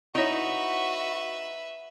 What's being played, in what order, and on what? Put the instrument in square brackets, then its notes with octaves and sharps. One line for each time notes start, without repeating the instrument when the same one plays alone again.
[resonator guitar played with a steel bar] D#4 [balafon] E4 C#5 [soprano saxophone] F#4 [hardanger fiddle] B4 E5